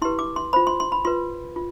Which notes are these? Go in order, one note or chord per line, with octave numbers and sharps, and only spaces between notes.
E4 G4 B4 C6
D6
C6
F4 C5 B5
C6
C6
B5
F4 B4 C6
F4